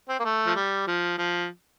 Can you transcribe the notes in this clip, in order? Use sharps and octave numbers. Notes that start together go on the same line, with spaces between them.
C4
A#3
A3
F3
G3
F3
F3